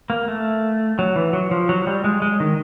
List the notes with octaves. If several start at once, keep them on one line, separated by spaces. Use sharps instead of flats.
A#3
A3
F#3
E3
F#3
F3
F#3
G3
G#3
G#3
D#3